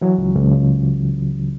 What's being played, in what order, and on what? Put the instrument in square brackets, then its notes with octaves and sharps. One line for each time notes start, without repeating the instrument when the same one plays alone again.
[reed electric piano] E3 F#3
C#2
C#2
C#3